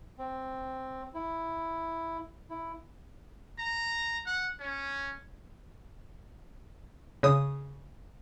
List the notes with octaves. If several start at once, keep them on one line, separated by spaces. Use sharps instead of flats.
C4
E4
E4
A#5
F#5
C#4
C#3 D#6